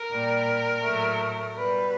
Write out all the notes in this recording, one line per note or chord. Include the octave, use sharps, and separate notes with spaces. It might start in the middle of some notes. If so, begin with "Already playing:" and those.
Already playing: A#4
A#2 G3
A2 F#3 A3
B2 G3 B4